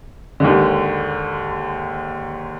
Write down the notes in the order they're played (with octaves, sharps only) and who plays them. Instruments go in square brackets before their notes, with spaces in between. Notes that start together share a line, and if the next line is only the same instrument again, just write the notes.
[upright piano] D#2 G#2 D3